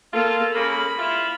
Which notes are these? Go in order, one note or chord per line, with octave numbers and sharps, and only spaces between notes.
A#3 F4 A4
C#3 A#3 B5
E4 F4